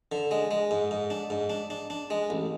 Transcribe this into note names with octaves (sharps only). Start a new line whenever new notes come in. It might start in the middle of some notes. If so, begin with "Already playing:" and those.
D3
G#3
G#3
G#2
G#2
D4
G#2
D4
D4
D4
G#3
A1